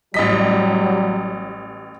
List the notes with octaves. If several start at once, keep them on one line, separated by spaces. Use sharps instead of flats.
A1 F#3 G3 D#5 B6